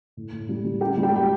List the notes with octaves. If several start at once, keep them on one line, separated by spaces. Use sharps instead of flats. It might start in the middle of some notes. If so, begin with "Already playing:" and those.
A2
A2
G3
G3
F#2 G4 G5
G3
G4 G5
G3 G5